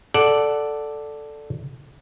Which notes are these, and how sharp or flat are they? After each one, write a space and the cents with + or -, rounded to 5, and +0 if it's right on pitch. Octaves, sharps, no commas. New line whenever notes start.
A4 +0 D5 +0 F#5 +5